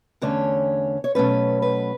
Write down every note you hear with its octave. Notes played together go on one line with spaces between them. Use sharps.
E2 D3 A3 C#4 C#5
C#5
B2 F#3 A3 C#4 B4
B4